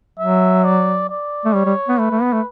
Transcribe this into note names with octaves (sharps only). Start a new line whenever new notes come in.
F#3 E5
D5
D5
A3
G3 C#5
G3
B3
A3 B4
A3
B3
A3